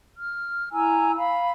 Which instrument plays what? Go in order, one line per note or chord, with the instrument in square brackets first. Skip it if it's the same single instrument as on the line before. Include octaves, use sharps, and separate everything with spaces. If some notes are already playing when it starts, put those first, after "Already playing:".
[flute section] F6
E4 G#5 A#5 E6
F5 B5